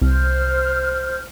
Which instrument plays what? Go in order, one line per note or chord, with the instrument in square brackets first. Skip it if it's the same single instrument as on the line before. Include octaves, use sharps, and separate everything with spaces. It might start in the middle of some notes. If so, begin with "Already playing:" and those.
[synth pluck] C2 [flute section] C5 F6